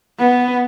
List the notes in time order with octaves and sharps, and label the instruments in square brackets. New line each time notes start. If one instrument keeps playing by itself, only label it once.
[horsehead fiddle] B3